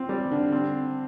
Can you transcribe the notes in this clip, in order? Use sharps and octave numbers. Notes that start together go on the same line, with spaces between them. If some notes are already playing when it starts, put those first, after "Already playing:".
Already playing: C4 F4
G3
D3
C4